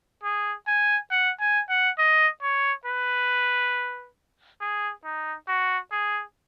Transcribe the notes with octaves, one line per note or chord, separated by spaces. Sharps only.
G#4
G#5
F#5
G#5
F#5
D#5
C#5
B4
G#4
D#4
F#4
G#4